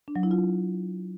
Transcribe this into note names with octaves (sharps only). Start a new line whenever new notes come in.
D4
F#3
E4
F4